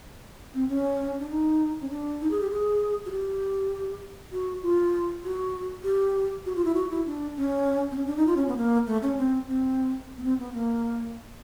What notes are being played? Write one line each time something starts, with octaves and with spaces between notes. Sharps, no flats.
C4
C#4
D4
D#4
C#4
D4
D#4
G#4
G4
G#4
F#4
G4
F#4
F4
F#4
G4
F#4
F4
E4
F#4
E4
D4
C#4
C4
C#4
D4
D#4
F4
C#4
B3
A#3
A3
C#4
C4
C4
B3
C4
B3
A#3